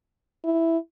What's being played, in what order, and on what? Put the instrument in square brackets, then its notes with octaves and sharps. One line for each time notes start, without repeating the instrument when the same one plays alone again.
[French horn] E4